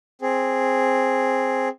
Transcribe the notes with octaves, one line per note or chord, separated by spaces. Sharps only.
C4 G#4